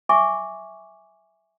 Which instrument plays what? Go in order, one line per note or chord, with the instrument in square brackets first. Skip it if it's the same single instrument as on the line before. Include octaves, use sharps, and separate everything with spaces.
[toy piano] E5 G#5 C#6 D6